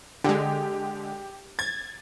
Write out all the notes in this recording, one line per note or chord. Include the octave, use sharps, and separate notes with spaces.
D3 G#3 G4
G#6 A6